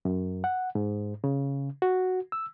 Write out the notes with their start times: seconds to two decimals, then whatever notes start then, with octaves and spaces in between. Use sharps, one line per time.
0.05 F#2
0.44 F#5
0.75 G#2
1.24 C#3
1.82 F#4
2.32 E6